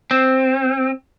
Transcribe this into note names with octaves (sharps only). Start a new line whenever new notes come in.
C4